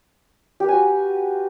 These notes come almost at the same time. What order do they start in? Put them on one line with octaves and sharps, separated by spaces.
G4 B4 G#5 F#4